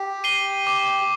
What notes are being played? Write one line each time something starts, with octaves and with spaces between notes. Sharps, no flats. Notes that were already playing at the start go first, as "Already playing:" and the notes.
Already playing: G4
C7 D#7 G7
D6